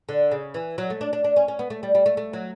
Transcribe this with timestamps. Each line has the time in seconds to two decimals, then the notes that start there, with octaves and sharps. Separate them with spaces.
0.09 D3
0.31 C#3
0.54 E3
0.78 F#3
0.90 A3
1.01 D4
1.13 D4
1.24 D4
1.36 C#4
1.48 C#4
1.59 B3
1.70 A3
1.83 G3
1.95 G3
2.06 A3
2.17 A3
2.33 F#3